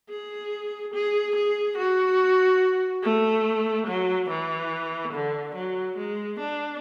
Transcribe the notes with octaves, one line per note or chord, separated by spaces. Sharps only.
G#4
G#4
G#4
F#4
A3
F#3
E3
D3
F#3
G#3
D4